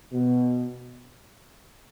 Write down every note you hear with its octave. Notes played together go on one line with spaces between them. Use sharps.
B2